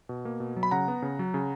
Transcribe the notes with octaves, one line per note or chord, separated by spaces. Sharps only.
B2
A#3
B2
F#3
B5
C#3 F#5 A#5
B3
C#3
F#3
C#3